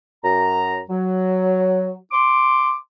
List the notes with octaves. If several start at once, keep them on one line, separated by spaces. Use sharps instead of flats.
F#2 A#5
F#3
C6 D6